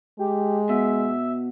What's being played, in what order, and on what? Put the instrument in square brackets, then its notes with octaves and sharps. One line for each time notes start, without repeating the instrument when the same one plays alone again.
[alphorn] G#3 [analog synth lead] G4
[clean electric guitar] B2 [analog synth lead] E5